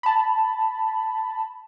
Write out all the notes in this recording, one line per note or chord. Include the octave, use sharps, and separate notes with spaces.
A5 B5